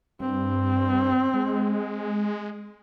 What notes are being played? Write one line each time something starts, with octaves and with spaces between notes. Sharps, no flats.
G2 C4
G#3